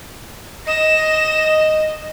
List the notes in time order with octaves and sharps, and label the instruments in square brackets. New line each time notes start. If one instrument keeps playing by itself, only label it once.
[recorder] D#5 [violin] A#6 E7